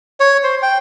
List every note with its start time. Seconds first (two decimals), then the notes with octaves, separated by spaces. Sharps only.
0.20 C#5
0.44 C5
0.62 G5